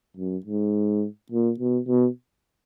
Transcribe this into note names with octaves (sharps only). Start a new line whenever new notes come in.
F#2
G#2
A#2
B2
B2